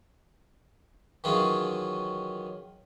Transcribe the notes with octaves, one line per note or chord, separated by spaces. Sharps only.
D#3 E3 F#3 C#4 F4 G#4